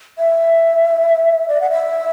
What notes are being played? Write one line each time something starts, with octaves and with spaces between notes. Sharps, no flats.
E5
D5
F#5
E5